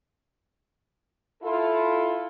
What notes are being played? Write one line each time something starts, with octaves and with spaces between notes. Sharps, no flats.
E4 F4 A4